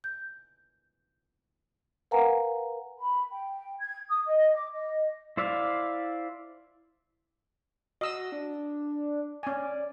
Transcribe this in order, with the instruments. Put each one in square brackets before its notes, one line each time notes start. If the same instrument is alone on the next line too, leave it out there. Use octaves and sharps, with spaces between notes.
[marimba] G6
A#4 B4 F5 F#5 G#5 A#5
[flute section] B5
G5
G#6
D#6
D#5
D6
D#5
[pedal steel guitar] E4 C5 D5 E5 F5
[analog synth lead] F#4 [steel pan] D#5 E6
[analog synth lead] D4
[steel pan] C#4 G#5 [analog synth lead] D5